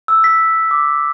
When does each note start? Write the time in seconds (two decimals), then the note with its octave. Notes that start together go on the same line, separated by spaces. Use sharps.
0.08 E6
0.24 B6
0.71 D6